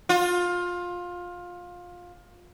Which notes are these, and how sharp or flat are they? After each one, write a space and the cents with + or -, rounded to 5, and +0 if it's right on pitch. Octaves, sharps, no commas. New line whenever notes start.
F4 +20